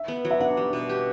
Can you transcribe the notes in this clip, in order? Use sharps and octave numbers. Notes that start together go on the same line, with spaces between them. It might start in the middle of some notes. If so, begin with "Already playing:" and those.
Already playing: E5
B3
F#3
E5
D4 F#5
G3
B2
G4